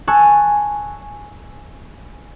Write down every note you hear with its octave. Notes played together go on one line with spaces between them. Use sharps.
G#5 A5 C#6 E6 F#6